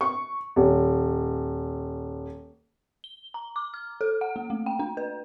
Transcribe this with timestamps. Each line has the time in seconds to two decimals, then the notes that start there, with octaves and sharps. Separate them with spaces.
0.01 C#6
0.56 D#1
3.04 G7
3.34 A#5
3.56 D6
3.74 F6
4.01 A4
4.21 F#5
4.36 A#3
4.50 A3
4.66 G5
4.79 D4
4.97 B4